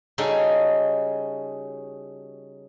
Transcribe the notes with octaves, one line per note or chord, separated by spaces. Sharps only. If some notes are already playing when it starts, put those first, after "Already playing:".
C#3 G3 D#4 F#4 G#4 A4